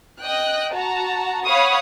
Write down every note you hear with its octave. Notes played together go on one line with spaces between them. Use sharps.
D#5 G5 F#6
F#4 A5 A#5
C#5 F5 F#5 B5 C#6 D#6